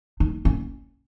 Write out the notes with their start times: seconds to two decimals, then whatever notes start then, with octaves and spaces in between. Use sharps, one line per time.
0.20 D#4
0.45 C#4